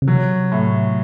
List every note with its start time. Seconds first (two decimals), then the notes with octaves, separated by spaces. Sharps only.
0.02 C#3
0.08 C3 F#3
0.52 A2